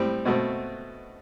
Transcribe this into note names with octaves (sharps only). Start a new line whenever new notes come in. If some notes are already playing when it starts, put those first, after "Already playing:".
Already playing: A2 G3 C4
B2 A3 C4 F#4